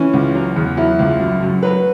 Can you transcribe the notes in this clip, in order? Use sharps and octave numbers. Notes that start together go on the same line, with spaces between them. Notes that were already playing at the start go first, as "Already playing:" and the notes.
Already playing: E3 C#4
C#2
F#3
E2
F#3 E4
C#2
F#2
F#2
F#3 B4